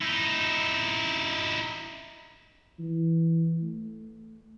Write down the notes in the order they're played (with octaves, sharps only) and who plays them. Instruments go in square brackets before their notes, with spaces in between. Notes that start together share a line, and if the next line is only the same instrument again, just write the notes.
[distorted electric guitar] D#4 E4
[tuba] E3
A3